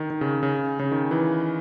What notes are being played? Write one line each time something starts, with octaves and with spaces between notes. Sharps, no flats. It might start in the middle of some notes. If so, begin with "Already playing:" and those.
Already playing: D#3
D#3
C#3
C#3
C#3
D#3
E3